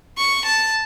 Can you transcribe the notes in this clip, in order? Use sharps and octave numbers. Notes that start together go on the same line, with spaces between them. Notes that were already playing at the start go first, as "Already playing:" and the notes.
C#6
A5